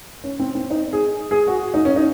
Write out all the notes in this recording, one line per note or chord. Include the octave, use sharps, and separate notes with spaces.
C#4
C4
C4
D#4
G#4
G#4
F#4
D#4
C#4
D#4